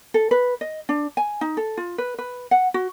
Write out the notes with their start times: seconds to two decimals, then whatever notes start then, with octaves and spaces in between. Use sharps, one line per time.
0.14 A4
0.31 B4
0.61 D#5
0.89 D4
1.17 G#5
1.41 D#4
1.57 A4
1.77 F4
1.98 B4
2.19 B4
2.51 F#5
2.74 F#4